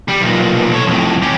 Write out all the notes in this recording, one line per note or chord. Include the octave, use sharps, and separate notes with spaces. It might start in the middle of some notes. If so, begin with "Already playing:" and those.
G3
B1 A#2
A4 C#5
F2 A2
C#4 G4